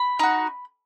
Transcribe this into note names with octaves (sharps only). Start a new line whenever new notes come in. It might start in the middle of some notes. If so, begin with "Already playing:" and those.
Already playing: B5
D#4 F#4